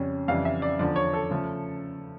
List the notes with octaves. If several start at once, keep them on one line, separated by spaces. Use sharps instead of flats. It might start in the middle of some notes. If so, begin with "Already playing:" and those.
Already playing: F2 C#3 G3 C#4
F2 C#3 E3 G3 F5
E5
D5
E2 D3 F3 D5
C#5
A4
C#3 F3 A3